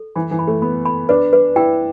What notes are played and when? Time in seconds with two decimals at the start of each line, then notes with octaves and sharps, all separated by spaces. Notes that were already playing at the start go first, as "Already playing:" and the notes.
Already playing: A4
0.16 E3 B5
0.31 E3
0.39 B5
0.47 A3
0.62 B3 B5
0.85 B5
1.09 D4 B4
1.33 B4
1.56 E4 G5